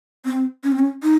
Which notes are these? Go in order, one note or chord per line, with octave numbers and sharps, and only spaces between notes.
C4
C#4
C4
C#4
D#4